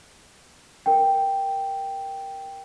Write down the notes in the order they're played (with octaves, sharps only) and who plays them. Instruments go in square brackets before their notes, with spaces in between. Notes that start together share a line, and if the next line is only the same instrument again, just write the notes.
[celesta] A#4 G5